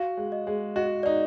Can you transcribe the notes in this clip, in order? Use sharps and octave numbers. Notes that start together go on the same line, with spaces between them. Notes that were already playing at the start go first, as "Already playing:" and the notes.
Already playing: F#4 F5
G#3
D#5
G#3
F#4 D#5
D#4 D5